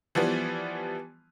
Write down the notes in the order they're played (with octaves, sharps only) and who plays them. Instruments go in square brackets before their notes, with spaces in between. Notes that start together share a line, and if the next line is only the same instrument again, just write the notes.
[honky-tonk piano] E3 F3 G3 B3